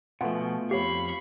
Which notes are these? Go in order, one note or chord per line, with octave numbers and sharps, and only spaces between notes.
B2 F3 A3 B3 F4 F#5 G#5 B5
F2 G4 C#5 F5 B5 C#6